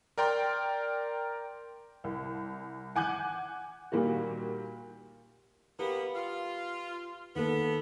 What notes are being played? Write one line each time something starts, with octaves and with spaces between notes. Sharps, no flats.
A#4 D5 G5 A#5 C6
C2
F#5 G#5 D6 F#6 G6
A#2 D#3 G3 A#3 F#4
A#3 B3 G4 B4
F4
D#3 A#3 B3 A4